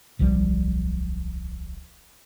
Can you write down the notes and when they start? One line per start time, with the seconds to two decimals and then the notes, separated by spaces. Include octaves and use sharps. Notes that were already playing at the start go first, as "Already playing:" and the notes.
0.19 D1 B1 F3 G3